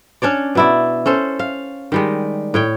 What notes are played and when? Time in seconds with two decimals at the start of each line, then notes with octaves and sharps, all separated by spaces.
0.22 C#4 D4 C#5 D5
0.55 B2 E4 D5
1.06 C#4 A4 C5
1.39 F5
1.92 D#3 G3 G#3
2.54 A2 C#5 G5